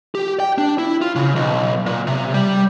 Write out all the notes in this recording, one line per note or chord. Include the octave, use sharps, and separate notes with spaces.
G4
G5
D4
E4
F4
C#3
B1
A#2
C3
G3